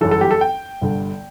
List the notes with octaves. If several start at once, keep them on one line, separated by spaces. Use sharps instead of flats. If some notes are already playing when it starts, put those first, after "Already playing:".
G1 F#2 E3 A4
A4
G4
A4
G5
G1 G2 D3